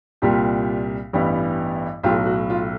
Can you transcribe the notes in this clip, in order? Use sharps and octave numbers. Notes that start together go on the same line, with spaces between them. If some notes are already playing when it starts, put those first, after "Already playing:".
C2 A#2 G3 A#3 F4 G4
A1 G2 E3 G3 B3
B1 A2 F#3 F4 G4
F#4
F4